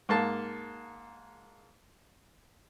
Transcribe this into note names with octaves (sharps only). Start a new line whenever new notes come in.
G#2 A#3 A5